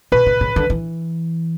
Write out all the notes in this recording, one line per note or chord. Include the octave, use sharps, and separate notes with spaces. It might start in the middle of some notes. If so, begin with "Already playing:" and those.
B2 B4
C3
C#3
D3
E3